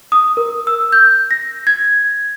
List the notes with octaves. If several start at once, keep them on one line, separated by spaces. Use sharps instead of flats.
D#6
A#4
E6
G6
A#6
G#6